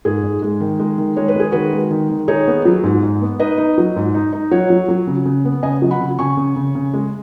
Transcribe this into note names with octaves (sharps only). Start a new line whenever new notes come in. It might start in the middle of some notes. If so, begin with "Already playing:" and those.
G#2 G#4
G#2
G#3
D#3
G#3
D#3
G#3 C#5
B4
G#3 G#4
D#3 F#4 B4
G#3
D#3
D#3
D#4 G#4 C#5
B3
F#3
G#2
G#2
B3
D#4 B4 D#5
D#4
F#3
G#2
D#4
D#4
F#3 C#5 F#5
F#3
F#3
C#3
C#3
B3
C#3 D#5 G#5
F#3
F#5 B5
C#3
C#3 G#5 C#6
C#3
C#3
C#3
G#3